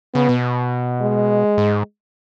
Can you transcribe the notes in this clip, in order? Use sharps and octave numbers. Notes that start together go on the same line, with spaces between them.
C#3 B3
B2
G#3
G#2